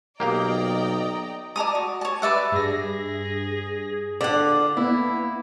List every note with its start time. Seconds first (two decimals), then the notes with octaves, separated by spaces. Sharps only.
0.20 B1 A#3 G4 D5 D#5 F5 G5 A#5
1.56 D5 A5 A#5 D#6
1.75 F#4
2.01 C#5 A5
2.22 B4 D5 E5 F#5
2.52 G2 G#4 A#6
4.21 D3 F4 D5 F#5
4.77 A#3 B3 E4